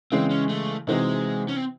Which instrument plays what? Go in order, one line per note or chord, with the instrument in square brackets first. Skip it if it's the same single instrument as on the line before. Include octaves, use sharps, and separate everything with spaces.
[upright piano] C#3 E3 G#3 [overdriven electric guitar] C4
[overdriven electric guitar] C#4
A3
[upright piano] C3 E3 C4 D#4 F#4 [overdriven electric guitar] G#3
[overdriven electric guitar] C#4
C4